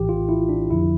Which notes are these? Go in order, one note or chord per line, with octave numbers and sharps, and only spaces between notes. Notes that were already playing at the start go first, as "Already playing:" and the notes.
Already playing: A#1 A2 E3 G4
F4
E4
D4
F2 D3 F3 E4